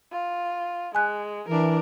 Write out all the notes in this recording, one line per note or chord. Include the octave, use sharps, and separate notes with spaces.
F4
G#3 G#5 F#6
E3 D4 A#4